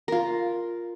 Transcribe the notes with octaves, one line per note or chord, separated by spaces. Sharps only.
F4 A#4